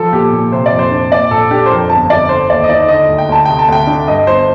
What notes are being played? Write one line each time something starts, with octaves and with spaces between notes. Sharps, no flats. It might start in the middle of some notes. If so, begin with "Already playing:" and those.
Already playing: F3 A4
A#2 G4
A#2
C3 C5
D5
F2
C5
D4
A#2 D5
A#1 A4
D4 G4
C5
F2 A#4
G1 A5
G1 D5
D3 C5
D#2 D5
D#5
D#4 D5
D3 D#5
D2
G5
D2 A5
C3 G5
A5
D2 G5
D4
G2 D#5
G1 C5